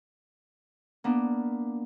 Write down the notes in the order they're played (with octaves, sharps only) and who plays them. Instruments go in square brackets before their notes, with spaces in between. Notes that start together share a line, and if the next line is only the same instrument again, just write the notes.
[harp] A#3 B3 D4